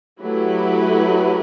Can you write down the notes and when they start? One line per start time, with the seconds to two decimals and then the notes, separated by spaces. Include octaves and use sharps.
0.22 F#3 A3 E4 G4 B4